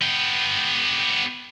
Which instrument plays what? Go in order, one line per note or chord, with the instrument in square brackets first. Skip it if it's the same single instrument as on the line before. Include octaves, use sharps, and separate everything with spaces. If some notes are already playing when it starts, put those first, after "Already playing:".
[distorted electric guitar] B3 G4